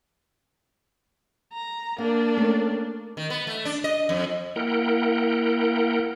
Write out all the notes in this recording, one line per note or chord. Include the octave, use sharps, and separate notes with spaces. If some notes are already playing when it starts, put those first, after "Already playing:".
A#5
A#3 D4 F5
A3 C4 C#4
D#3
B3
A3
D4
D#5
F2
A#3 E4 A#4 F#5 G5